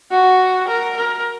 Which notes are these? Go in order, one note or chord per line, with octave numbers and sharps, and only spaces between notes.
F#4
A#4
A#4